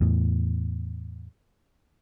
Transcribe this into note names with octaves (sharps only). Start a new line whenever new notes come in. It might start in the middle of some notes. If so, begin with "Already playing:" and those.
E2 A2